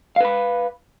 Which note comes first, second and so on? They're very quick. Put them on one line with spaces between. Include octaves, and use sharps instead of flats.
F5 B4 B5